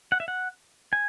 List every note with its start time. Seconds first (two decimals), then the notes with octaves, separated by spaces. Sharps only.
0.12 F#5
0.20 E5
0.28 F#5
0.93 G#5